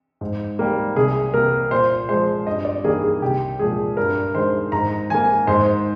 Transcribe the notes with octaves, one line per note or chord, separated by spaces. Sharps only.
G#2
G3 A#3
C2 G#4
C3 G3 A#3 A#4
A#2 C5
F3 G#3 C5
G2 D#5
D5
D#3 G3 A#3 G#4
G#4
C2 G4
A#2 F3 G#3 G#4
G2 A#4
D#3 G#3 C5
G#2 A#5
D#3 A#3 G#5
G#2 C5